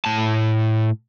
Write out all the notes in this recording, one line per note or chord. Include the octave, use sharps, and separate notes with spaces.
A2 A5